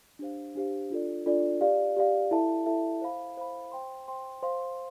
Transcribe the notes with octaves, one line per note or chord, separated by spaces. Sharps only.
D4 G4 C5 F5
D4 G4 C5 F5
D4 F4 A4 D5
D4 F4 A4 D5
G4 D5 F5
G4 D5 F5
E4 A4 E5 A5
E4 A4 E5 A5
C5 F5 B5
C5 F5 B5
C5 G5 C6
C5 G5 C6
C5 F5 C6